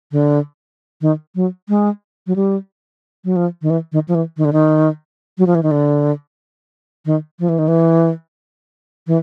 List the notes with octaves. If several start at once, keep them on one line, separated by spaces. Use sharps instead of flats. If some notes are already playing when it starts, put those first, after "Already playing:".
D3
D#3
F#3
G#3
F#3
G3
F#3
F3
D#3
E3
D#3
F3
E3
D#3
D3
D#3
F#3
F3
E3
D#3
D3
D#3
F3
E3
D#3
E3
E3